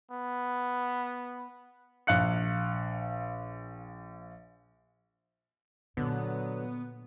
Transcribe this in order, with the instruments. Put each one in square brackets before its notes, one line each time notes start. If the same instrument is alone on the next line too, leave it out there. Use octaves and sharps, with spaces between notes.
[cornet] B3
[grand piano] A#1 F5 F#6 C#7
[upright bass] A#2 [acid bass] D3 [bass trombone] F#3 [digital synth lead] B3